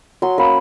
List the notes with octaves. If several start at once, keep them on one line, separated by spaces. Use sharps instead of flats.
F#3 C6
A#3 C#4 B5